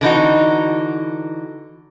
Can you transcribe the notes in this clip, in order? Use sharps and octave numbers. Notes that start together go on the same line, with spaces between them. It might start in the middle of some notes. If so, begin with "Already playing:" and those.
D3 E3 D#4 F#4